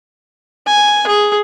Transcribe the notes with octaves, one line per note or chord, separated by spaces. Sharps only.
G#5
G#4